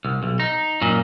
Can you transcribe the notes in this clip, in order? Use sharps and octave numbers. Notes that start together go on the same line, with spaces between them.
C2
B1
D#4
F#2 A#2